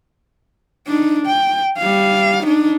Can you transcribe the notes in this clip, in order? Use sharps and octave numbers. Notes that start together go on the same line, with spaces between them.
D4 D#4
G5
G3 F5
D4 D#4